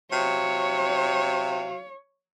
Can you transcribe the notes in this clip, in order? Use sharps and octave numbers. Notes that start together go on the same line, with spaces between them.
C3 F#3 C#5 F5